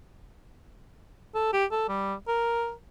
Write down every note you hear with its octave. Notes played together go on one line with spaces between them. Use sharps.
A4
G4
A4
G3
A#4